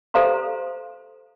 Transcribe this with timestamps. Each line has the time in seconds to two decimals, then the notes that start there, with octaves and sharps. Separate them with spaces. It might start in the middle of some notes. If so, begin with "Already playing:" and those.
0.14 G4 A4 C5 F5 A#5 C6